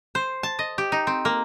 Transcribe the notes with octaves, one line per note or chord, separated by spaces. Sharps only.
C5
A5
D#5
G4
D#4
C4
A#3